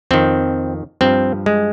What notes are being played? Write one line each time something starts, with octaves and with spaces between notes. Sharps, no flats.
F2 D#3 C4
G2 F3 C4
G#3